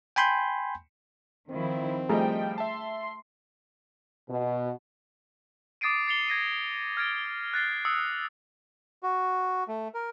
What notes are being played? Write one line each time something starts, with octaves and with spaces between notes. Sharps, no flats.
G5 G#5 B5 C6 G6
D#3 F3 C4 E4
F3 G3 A3 G#4 D#5 G5 A#5
E5 A5 C6
B2
D6 D#6 A6 C7 D7 D#7
A6 C7 C#7 F7 G7
G#6 A#6 D#7
F6 G#6 A6 D7
F#6 A6 C7
D#6 E6 C#7
F#4
A3
A#4